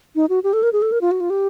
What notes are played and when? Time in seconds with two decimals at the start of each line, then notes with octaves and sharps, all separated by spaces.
0.15 D#4
0.29 F#4
0.44 G4
0.53 A4
0.63 A#4
0.73 G#4
0.82 A4
0.92 A#4
1.01 F4
1.11 F#4
1.20 F4
1.30 G4